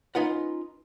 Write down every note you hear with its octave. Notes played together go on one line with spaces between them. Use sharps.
C#4 D#4 F4 B4 F#5